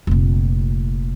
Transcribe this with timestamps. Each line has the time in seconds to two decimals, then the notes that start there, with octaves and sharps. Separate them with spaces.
0.07 F1 A#2